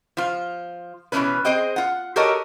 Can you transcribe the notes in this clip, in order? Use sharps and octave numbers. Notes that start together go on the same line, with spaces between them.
F3 F4
B2 E3 F3 G#3 C#4 B4
C4 G#4 C5 D#5 G5
F4 F#5
F#4 G4 A4 A#4 C#5 D#5